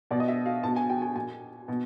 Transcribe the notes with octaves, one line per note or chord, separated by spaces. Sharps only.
B2 D5
D#5
E5
F5
B2 A5
G#5
G5
G#5
A#2 G#5
B2